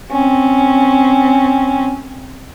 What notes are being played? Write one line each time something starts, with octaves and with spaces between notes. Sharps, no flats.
C4 C#4